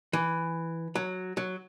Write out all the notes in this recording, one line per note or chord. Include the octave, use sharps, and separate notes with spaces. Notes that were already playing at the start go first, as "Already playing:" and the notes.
E3
F#3
F#3